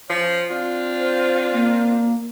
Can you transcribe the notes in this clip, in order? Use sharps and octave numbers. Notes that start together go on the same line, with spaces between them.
F3 C#4
C4 D4 F4
C5
A#3